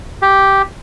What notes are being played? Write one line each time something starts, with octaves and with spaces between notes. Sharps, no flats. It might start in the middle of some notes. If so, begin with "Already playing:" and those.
G4